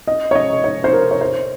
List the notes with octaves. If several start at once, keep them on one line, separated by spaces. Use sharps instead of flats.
D#5
C#5
D#5
C#5
C5
A#4
C#5
C5